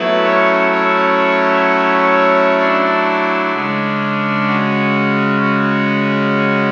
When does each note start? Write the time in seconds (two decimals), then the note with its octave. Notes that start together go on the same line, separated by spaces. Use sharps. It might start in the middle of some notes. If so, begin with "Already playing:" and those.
Already playing: F#3 A3 B3 E4 B4
0.24 C#4 C#5
0.71 C#4 C#5
2.59 D4 D5
3.52 C#3 G#3 C#4
4.46 F#4
5.40 F#4